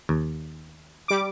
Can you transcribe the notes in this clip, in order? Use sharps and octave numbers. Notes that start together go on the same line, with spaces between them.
D#2
G3 D6